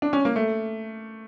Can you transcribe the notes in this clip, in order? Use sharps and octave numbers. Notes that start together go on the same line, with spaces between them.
D4
C#4
A#3
A3